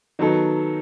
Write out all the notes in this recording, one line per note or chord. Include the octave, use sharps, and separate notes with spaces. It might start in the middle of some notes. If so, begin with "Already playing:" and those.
D#3 F#3 B3 D#4 A4